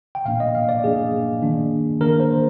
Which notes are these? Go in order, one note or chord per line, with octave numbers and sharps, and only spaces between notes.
G5
A#2 F3 A#3 D4 F5
D#5
F5
D5
A#2 F3 A#3 D4 G#4
D#3 A#3 D4
D#3 A#3 D4 A#4
C5